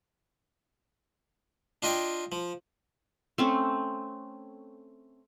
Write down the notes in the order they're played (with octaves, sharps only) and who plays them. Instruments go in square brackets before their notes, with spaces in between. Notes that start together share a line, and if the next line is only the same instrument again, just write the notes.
[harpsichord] D4 F4 D#5 G5 G#5
F3
[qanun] A3 C4 C#4